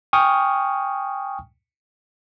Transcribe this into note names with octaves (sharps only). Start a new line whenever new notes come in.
G5 G#5 C#6 D#6 F6